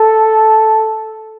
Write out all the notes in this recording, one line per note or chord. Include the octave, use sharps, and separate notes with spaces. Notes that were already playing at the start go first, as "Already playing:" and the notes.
Already playing: A4